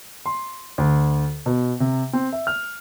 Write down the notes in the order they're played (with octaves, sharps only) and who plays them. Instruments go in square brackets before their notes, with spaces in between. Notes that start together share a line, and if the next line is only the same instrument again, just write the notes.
[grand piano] C6
D2
B2
C3
C4
E5
F6